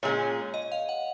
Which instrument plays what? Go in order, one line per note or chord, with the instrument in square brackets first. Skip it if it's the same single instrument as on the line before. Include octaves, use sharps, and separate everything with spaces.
[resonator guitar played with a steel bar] A#2 G#3 C#4 [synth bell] C#5
[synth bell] D#5
F5
F#5